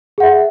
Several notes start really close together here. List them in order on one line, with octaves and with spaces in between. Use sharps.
G#4 F#5 E5